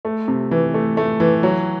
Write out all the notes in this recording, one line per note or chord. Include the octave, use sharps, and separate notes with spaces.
A3
C3
E3
A3
A3
E3
F#3